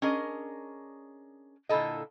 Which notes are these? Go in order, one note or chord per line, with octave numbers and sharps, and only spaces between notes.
C#4 D4 G#4 A#4 D#5
A#2 D3 E4 A4 D#5